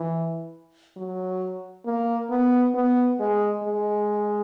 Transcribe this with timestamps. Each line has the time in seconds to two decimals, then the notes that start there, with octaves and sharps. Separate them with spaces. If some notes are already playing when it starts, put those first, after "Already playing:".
Already playing: E3
0.97 F#3
1.85 A#3
2.30 B3
2.74 B3
3.19 G#3
3.63 G#3